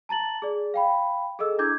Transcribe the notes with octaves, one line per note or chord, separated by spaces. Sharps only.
A5 A#5 A6 F#7
G#4 D5
F5 G5 B5
G#4 A4 D#5 E6
D4 E4 D6 G6 G#6